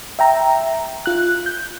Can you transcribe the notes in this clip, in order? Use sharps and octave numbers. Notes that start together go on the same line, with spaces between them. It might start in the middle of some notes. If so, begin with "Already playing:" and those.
E5 G5 A#5
F4 F#6
G6